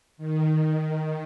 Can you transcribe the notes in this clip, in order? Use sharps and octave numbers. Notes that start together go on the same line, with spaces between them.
D#3